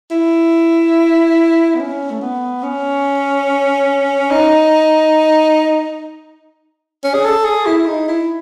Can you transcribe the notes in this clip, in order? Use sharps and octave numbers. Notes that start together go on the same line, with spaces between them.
E4
B3
C#4
A3
B3
C#4
D#4
C#4
G#4
A4
G#4
E4
D#4
E4